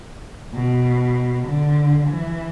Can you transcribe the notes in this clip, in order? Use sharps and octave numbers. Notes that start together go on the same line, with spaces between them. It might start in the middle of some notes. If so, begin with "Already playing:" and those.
B2
D3
E3